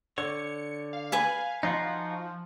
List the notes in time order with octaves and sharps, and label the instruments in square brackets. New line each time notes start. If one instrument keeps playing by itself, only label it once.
[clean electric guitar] D3 C#5 [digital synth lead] C#7
[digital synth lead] F5
[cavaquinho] B4 G#5 B5
[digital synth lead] F3 [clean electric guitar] D#4 F4 F#4